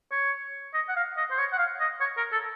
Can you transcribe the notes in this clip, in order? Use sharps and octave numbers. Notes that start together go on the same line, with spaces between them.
C#5
D#5
F#5
F5
D#5
C5
C#5
F#5
F5
D#5
C#5
A#4
A4